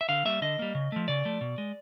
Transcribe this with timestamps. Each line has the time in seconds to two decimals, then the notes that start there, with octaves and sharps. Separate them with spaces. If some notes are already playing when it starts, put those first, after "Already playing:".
0.01 E5
0.09 D3 F5
0.25 G3 A#3 E5
0.42 D3 D#5
0.59 G3 A#3
0.75 C#3
0.92 F3 A3
1.08 C#3 D5
1.25 F3 A3
1.41 B2
1.58 G#3